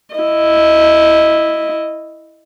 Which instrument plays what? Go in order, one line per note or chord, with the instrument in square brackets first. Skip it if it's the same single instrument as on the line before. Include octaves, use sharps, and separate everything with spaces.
[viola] E4 D#5